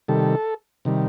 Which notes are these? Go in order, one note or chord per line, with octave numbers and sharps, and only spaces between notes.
C3 D#3 G3 A4
C3 D#3 G3